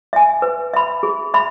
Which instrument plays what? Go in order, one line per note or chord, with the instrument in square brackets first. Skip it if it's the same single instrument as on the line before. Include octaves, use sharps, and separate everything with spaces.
[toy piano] E5 G#5
B4
E5 B5
G#4
E5 B5